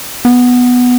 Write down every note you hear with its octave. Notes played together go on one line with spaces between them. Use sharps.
B3